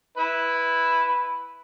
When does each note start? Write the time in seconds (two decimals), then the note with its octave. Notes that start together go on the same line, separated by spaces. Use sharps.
0.17 E4 B4